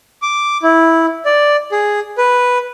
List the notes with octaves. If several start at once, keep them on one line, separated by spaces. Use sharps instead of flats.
D6
E4
D5
G#4
B4